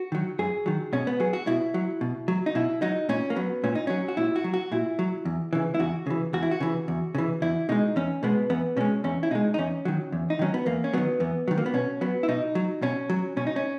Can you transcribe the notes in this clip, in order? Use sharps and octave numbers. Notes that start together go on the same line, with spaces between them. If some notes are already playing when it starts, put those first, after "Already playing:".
Already playing: F#4
D#3 F#3
F#2 G#4
D#3 F#3
B2 C#4
B3
F#3 G#4
F#4
B2 E4
F#3
B2
F#3
D#4
B2 E4
F#3 D#4
A#2 C#4
A#3
F#3 B3
A#2 C#4
D#4
F#3 C#4
F#4
A#2 E4
F#4
F#3
F#4
A#2 E4
F#3
E2
C#3 E3
E4
E2 F#4
C#3 E3
E2 F#4
E4
F#4
C#3 E3
E2
C#3 E3
E2 E4
B2 G#3 D#4
E2 C#4
B2 G#3 B3
E2 B3
B2 G#3 C#4
E2 C#4
E4
B2 G#3 D#4
D#4
E2 C#4
D#3 F#3
E2
D#4
D#3 F#3 C#4
B3
E2 A#3
C#4
D#3 F#3 B3
E2 B3
D#3 F#3
A#3
B3
B2 C#4
F#3 B3
E4
B2 D#4
F#3
B2 C#4
F#3
B2 C#4
D#4
C#4